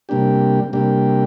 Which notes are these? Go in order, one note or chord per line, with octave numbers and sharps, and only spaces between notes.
C3 G3 A#3 D4 G4
C3 G3 A#3 D4 G4